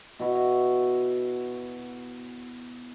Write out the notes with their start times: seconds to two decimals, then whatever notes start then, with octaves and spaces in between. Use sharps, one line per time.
0.19 B2 E4 F#4